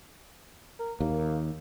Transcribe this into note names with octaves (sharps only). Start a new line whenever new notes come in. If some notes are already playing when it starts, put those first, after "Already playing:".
A#4
D#2 A#3